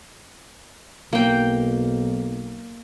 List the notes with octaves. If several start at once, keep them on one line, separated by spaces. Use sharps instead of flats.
B1 A#3 G5